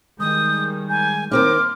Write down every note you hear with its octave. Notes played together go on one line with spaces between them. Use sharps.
D#3 G3 G#3 D#6 G6
G#5 A#5 G6
D#3 A#3 C4 D#4 C6 D6 F6